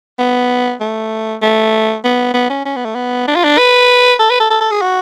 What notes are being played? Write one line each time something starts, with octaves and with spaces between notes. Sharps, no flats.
B3
A3
A3
B3
B3
C#4
C#4
B3
A3
B3
D4
F4
D4
B4
A4
B4
A4
A4
A4
G#4
F#4